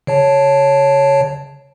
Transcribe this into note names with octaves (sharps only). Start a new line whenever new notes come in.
C#3 C#5 A5